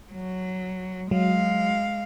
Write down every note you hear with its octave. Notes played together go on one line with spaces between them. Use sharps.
F#3
F#3 G#3 F5